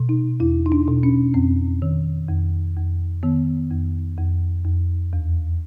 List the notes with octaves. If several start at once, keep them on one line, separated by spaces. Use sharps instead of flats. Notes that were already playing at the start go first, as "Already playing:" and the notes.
Already playing: B2
D#4
E2 E4
D#4
D4
B2
C#4
F2 C4
D#3
F2
F2
D#3 B3
F2
F2
F2
E2